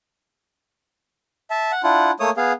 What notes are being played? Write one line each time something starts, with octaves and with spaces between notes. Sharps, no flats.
E5 A5
F#5
D4 E4 F4 F#5
A3 A#3 C#5 D#6
B3 G#4 F5